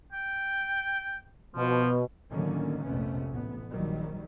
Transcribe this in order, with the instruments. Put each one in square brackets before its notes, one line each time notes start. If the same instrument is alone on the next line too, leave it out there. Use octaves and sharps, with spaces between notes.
[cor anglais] G5
[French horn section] B2 [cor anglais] F3
[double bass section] A2 D3 D#3 F#3 A#3 C#4
A#1 F2 C3 A3 B3 C#4
A1 B3
A#1 D#3 F#3 G3